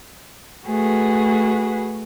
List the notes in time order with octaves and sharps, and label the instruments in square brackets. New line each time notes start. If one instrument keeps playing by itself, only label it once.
[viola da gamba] A3 [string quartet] F#4 G#4 B4